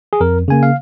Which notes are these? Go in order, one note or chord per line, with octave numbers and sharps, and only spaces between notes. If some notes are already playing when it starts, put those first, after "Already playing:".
G#4
F2 A#4
C#3 A#3 G#5
F5